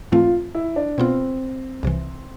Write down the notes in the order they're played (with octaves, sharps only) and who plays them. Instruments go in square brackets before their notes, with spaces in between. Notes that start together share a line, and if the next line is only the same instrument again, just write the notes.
[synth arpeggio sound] G#2 E3 A3 C4 [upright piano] F4
[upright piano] E4
D4
[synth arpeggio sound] B2 B3 F4 [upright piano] C4
[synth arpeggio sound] C2 C3 E3